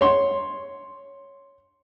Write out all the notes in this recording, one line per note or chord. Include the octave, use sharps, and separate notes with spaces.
C#5 C6